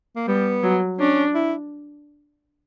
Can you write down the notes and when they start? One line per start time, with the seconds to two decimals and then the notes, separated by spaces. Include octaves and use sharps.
0.16 A#3
0.28 G3 B3
0.63 F#3
0.99 C#4 D4
1.35 E4